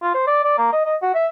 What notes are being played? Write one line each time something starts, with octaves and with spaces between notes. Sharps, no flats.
F4
C5
D5
D5
A#3
D#5
D#5
F#4
E5